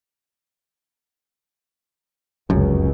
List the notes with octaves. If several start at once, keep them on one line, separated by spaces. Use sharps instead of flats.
F1 C#2 F#2